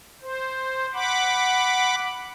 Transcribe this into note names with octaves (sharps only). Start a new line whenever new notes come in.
C5
F#5 B5 D6